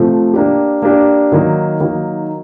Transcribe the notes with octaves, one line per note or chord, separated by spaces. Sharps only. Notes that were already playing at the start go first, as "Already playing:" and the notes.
Already playing: C3 F3 A3
A#3 D4 G4
A#3 D4 G4
D#3 F#3 A#3 D#4
D#3 F#3 A#3 D#4